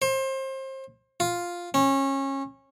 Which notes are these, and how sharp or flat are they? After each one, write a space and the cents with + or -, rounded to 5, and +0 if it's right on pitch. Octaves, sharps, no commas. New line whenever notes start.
C5 +30
F4 +5
C#4 -25